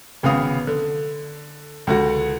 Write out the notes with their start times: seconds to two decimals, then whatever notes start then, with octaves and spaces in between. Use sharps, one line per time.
0.23 G#1 C#3 B3 F5 D#6
0.67 D3
1.87 C#2 D3 F#4